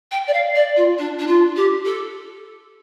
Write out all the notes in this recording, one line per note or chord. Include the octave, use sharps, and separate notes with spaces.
G5
D5
F5
D5
F4
D4
D4
F4
G4
A4